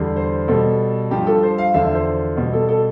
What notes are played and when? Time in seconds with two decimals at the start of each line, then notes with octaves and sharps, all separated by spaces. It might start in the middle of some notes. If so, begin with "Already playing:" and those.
Already playing: E2 D3 G3
0.16 C5
0.48 B2 G3 A4
1.11 G2 F3 G4
1.27 A4
1.43 C5
1.58 F5
1.74 E2 D3 F3 E5
1.95 C5
2.37 B2 G3
2.53 A4
2.69 A4